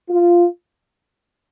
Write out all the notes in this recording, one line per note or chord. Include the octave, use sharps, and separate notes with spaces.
F4